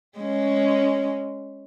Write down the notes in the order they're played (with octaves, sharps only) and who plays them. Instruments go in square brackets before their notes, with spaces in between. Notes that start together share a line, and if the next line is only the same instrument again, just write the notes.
[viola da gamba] G#3 C#4